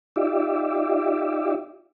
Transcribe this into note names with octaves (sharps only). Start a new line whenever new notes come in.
D#4 F4 G4 D5 E5